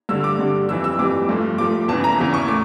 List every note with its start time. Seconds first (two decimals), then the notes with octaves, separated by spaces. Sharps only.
0.09 G2 D3 G3 E6
0.24 D6
0.39 G2 D3 G3
0.69 F2 E3 G3 E6
0.84 E6
0.99 F2 E3 G3 D6
1.29 G2 F3 A3
1.58 G2 F3 A3 D6
1.88 E2 C#3 E3 A5
2.04 A#5
2.19 E2 C#3 E3 A#5
2.34 C#6
2.48 A2 D6